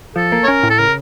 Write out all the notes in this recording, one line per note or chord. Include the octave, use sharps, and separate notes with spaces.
F3 A4
A#3
C#5
C#4 A#4
A2
A4
C#3 A#4